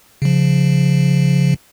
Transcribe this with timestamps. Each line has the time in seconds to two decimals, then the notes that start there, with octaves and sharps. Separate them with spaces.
0.22 C#3 F3